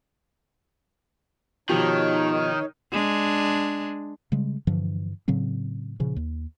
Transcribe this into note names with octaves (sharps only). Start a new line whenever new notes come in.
B2 D#3 F3 D#4 G4 C#5
G#3 D4
C#3 G3 G#3
G2 D3 E3 F3
A2 C#3 F#3 C4
A#2 C#3 F3
D#2